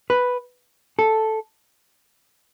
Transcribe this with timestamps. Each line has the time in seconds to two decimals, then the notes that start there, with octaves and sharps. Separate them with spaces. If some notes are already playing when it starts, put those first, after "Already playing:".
0.10 B4
0.99 A4